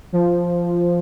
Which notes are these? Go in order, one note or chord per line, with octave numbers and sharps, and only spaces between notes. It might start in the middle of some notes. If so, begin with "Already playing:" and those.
F3